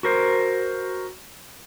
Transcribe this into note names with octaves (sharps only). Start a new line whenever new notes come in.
F#4 A#4 C5